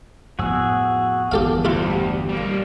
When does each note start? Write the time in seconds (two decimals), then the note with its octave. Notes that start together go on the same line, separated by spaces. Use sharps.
0.39 F2 A2 B3 F#4 G#4 E6
1.32 G1 E2 B3 G4 A4 F5
1.65 D2 E4 F4 G4
2.29 G3 A#3